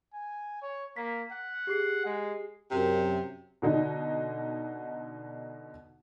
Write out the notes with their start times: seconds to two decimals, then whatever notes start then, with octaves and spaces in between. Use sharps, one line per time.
0.13 G#5
0.62 C#5
0.96 A#3 B6
1.31 F#5
1.67 G4 G#4 C7
2.05 G#3
2.71 F#2 C3
3.62 B2 D3 D#4